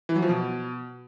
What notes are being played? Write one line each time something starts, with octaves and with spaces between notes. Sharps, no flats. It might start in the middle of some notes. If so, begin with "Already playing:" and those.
E3
F#3
F3
B2